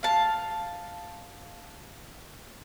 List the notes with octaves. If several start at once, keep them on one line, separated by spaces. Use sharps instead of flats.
F5 A5